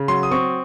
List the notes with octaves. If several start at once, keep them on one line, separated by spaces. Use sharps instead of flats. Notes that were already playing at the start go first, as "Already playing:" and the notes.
Already playing: C#3
F#3 C6
D#6
C4 C#6